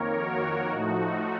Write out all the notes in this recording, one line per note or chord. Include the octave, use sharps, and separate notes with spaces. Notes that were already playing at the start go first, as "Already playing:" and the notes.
Already playing: F2 D#3 A#3 A#4 C#5
F#4 A#4
A2 F3 A3 D#4 F#4